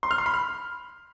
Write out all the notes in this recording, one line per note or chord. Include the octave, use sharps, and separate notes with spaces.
C6
F6
C6
B5
F6